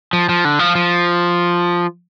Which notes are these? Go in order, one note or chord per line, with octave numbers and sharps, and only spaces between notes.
F3
F3
D3
F3
F3